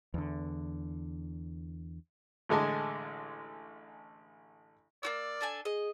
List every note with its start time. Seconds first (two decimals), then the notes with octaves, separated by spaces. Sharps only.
0.14 E2 D3
2.49 A1 D3 G#3 G#5 A5
5.03 A#3 F#4 D5 E6
5.41 D4 A4 G#5
5.65 G#4 D#5